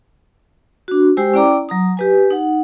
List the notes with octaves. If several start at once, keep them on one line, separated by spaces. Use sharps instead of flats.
D4 F#4
G#3 G4 C5 G5 G#5 E6
C#4 E4 D5 G5 A#5 D6
F#3 A#5 D#6
G4 B4 G#5
D#4 F#5